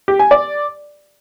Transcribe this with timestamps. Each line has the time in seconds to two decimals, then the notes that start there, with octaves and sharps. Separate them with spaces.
0.08 G4
0.19 G#5
0.31 D5